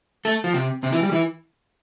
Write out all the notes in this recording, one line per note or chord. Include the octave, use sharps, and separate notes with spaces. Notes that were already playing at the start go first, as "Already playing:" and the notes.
A3 A4
F3 F4
C3 C4
C3 C4
E3 E4
G3 G4
E3 E4